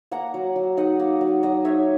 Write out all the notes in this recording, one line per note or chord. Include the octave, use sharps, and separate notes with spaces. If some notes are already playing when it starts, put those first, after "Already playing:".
A#3 F#5 A#5
F#3
F#3
D#4 D#5 F#5
A#3
F#3
F#3 D#5 F#5
D#4 C#5 E5